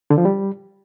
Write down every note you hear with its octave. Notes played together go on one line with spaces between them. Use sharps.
D3
F3
G3